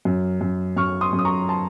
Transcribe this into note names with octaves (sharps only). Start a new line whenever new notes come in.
F#2
F#2
F#2 C#6 F6
C6 D#6
F#2
D#6
A#5 C#6
A5 C6